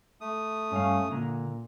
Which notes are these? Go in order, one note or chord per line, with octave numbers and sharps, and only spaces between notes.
A3 D#6
G2 C#4 F5
A#2 D3 A#3 A#5